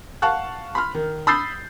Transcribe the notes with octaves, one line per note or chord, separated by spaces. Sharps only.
F5 F#5 A5 C#6 F#6
B5 C6 F6
D#3
B5 D#6 E6 G6 A6 C7